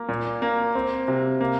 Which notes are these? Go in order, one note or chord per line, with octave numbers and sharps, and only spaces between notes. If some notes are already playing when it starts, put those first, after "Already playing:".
Already playing: A#3
A#2
A#3
C4
C3
A#3